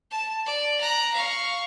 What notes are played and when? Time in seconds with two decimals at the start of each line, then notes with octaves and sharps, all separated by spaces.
0.11 A5
0.46 D5
0.80 A#5 F#6
1.14 F5 C#6